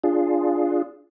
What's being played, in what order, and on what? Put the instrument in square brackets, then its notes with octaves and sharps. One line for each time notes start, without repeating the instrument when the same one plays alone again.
[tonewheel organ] D4 F4 G#4